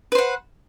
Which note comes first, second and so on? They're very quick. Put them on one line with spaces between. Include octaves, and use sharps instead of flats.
B4 C5 F#5